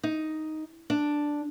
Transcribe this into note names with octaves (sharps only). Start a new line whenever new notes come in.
D#4
D4